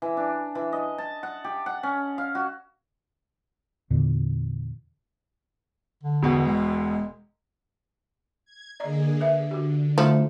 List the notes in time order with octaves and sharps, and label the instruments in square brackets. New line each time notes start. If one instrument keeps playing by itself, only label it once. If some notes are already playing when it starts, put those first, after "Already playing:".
[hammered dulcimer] E3
D4
E3
D#5
A5
F#5
G4
F#5
C#4
F5
F#4
[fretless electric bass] E2 A#2 D3
[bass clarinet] D3
[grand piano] E1 B2 B3
[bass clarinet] G#3
[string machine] G#6
[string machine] D3 A#3 G#4 [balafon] D5 D#5 A#5
[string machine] D3 [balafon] A#4 B4 E5
[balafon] F#4 G4
[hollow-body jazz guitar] D2 A3 [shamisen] F3 [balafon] D#4 A#5